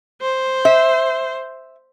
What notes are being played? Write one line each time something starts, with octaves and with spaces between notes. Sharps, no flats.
C5
E5